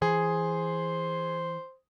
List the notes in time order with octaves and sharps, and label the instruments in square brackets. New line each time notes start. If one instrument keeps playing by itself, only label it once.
[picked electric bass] E3 [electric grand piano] G#4 [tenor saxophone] C5